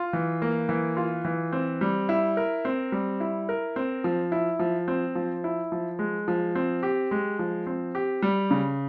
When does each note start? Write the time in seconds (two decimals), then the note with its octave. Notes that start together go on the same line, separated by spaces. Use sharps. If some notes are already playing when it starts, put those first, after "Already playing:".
Already playing: F4
0.13 E3
0.42 A#3
0.69 E3
0.97 F4
1.25 E3
1.52 C4
1.81 G3
2.09 E4
2.37 A#4
2.65 C4
2.92 G3
3.20 E4
3.49 A#4
3.76 C4
4.04 F3
4.32 E4
4.59 F3
4.88 C4
5.15 F3
5.44 E4
5.72 F3
5.99 G#3
6.28 F3
6.55 C4
6.83 G4
7.11 G#3
7.39 F3
7.67 C4
7.95 G4
8.22 G3
8.51 C#3